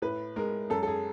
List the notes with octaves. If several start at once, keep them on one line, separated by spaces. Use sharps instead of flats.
A2 B4
G#3 A#4
F#2 A4
A4
G#4